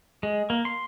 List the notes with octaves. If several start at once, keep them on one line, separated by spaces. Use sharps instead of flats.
G#3
A#3
C6